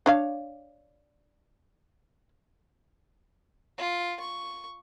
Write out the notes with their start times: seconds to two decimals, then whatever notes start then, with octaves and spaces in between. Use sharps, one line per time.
0.06 D4 C#5 F5
3.78 F4
4.20 C#6